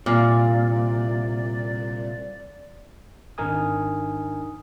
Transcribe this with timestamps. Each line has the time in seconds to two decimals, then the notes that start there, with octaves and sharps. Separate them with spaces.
0.06 C2 A#2 D5 F5
3.38 G#1 D4 D#4 A#4 G#5 D#6